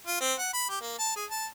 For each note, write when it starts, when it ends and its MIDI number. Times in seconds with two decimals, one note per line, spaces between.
0.07 0.18 65
0.20 0.34 60
0.39 0.49 78
0.53 0.67 83
0.69 0.79 67
0.81 0.98 58
0.99 1.12 81
1.16 1.25 68
1.30 1.46 81